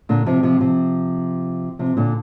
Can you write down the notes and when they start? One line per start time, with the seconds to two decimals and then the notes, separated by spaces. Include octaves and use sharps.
0.09 A#2 D3
0.26 C3 F3
0.43 C3 F3
0.61 C3 F3
1.79 C3 F3
1.97 A#2 D3